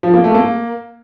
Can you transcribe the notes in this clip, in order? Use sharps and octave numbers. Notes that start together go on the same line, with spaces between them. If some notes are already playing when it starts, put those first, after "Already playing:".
F3
A#3
A3
A#3